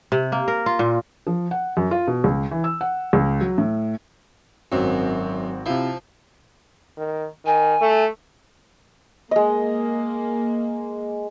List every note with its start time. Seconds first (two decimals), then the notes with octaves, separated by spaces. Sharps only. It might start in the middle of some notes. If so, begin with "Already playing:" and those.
0.12 C3
0.32 A#3
0.48 A#4
0.66 F4
0.79 A#2
1.27 F3
1.51 F#5
1.77 F#2
1.91 F4
2.07 B2
2.24 C#2
2.51 E3
2.64 E6
2.81 F#5
3.13 C#2
3.41 F#3
3.58 A2
4.72 G#1 F#2 C4 F#4
5.66 C3 F3 E4
6.97 D#3
7.45 D#3 G#5
7.81 A3
9.31 G#3 A#3 D#5